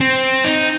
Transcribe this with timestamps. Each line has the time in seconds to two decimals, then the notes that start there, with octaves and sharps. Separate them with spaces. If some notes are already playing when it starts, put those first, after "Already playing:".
0.01 C4
0.44 D#4